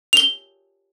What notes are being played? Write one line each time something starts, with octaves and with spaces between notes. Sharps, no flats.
F7 G7